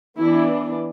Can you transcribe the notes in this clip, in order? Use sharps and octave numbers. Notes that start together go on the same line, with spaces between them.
E3 B3 D4 E4